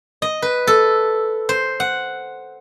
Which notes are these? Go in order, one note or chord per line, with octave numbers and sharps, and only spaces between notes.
D#5
B4
A4
C5
F#5